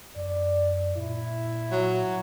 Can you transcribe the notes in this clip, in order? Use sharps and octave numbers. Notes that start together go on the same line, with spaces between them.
F#2 D5
A#2 E4
F#3